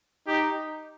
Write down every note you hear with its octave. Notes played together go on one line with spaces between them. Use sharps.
D#4 G4